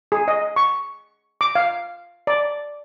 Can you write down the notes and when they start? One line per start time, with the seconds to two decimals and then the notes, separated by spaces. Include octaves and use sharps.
0.12 G#4
0.28 D#5
0.56 C#6
1.41 D6
1.55 F5
2.27 D5